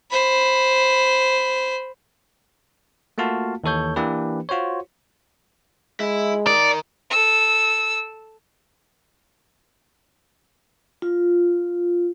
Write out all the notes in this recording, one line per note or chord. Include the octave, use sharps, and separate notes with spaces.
C5 B5
A3 A#3 F4 F#4 F5 A5
D#2 E3 A4 C#5 G6
E3 A#3 D4 G4 B4
F4 F#4 C5 C#5
G#3 E4
D#3 D#4 D5
A4 E6
F4